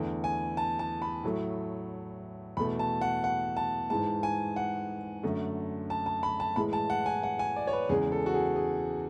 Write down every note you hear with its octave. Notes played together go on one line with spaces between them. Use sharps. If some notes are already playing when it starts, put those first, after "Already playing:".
Already playing: E2 D3 A3
G#5
A5
A5
B5
A2 F#3 A3
E2 B2 A3 B5
A5
F#5
F#5
A5
G#2 E3 G#3 A5
G#5
F#5
F#2 D3 A3
A5
A5
B5
A5
A2 E3 G#3 B5
A5
F#5
G#5
F#5
G#5
D5
C#5
B4
E2 C#3 G#3 G#4
A4
F#4
G#4
G#4